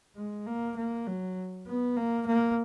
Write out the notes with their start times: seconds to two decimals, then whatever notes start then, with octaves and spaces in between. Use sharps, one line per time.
0.17 G#3
0.46 A#3
0.77 A#3
1.07 F#3
1.67 B3
1.96 A#3
2.27 A#3